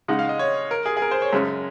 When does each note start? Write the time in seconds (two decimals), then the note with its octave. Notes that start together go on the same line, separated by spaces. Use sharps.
0.08 C#3 G#3 D#4 F#5
0.19 F5
0.29 D#5
0.39 C#5
0.71 A#4
0.86 G#4
0.97 G#4
1.02 A#4
1.11 C5
1.22 C#5
1.33 F#2 C#3 G#3 C#4